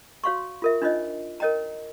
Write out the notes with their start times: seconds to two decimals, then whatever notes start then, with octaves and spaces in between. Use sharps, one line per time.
0.24 F#4 C#5 F5 F#5 C6 C#6
0.62 F4 A#4 E5
0.82 D4 D#4 F4 C5 C#5 D#5
1.40 A#4 C#5 D#5 G5 A#5